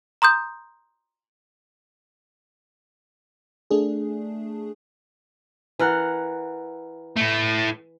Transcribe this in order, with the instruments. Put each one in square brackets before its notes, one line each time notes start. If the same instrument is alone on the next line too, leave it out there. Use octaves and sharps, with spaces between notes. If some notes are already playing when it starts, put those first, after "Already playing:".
[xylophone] A#5 C6 D#6 G6
[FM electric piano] A3 D4 G#4
[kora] E3 A#4 F#5
[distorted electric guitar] A2 A3